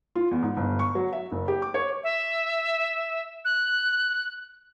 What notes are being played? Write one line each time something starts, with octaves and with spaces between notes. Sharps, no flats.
F4
E2
G#2
G1
C#6
F#3
E5
F#1
G4
D6
C#5
E5
F#6